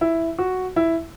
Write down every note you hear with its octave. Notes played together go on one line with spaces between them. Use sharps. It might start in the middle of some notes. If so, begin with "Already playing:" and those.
E4
F#4
E4